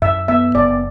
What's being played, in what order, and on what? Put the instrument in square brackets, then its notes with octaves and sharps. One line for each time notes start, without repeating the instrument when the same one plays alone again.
[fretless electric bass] F#2 [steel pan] E5
[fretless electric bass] B3 [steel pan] E5
[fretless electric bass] F#1 [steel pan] D5